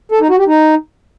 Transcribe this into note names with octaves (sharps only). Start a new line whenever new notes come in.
A4
D#4
F#4
G4
D#4